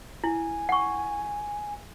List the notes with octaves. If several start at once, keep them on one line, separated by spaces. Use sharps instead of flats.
E4 G#5
F#5 C#6